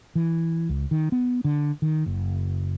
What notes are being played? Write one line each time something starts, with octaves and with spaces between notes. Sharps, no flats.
E3
C#2
D#3
B3
D3
D#3
F#1